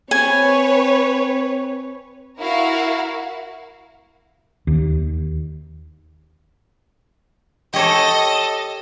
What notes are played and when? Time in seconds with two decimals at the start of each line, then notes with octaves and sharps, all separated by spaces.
0.11 C4 B4 C#5 G#5
2.39 E4 F#4 A#4 F5 F#5
4.67 D#2
7.73 G4 A4 C#5 D#5